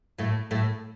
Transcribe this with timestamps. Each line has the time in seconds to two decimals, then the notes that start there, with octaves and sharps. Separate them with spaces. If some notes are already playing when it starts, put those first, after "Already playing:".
0.18 A2 A3
0.51 A2 A3